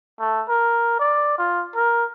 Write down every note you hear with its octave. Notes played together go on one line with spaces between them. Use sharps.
A3
A#4
D5
F4
A#4